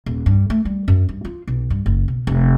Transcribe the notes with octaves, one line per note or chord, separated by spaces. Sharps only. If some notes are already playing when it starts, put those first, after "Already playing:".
D#1
G2
A3
G3
F#2
G2
F4
B1
G2
F#1
B2
F1